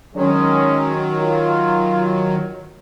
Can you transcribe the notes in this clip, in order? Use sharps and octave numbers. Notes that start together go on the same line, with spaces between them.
D#3 F#3 G#3 C#4
F4